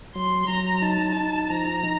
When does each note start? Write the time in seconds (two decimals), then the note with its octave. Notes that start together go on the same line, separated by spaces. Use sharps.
0.15 F#3 C6
0.48 F#3 A#5
0.82 D#4 A5
1.17 D#4
1.50 F3 A#5
1.83 D#4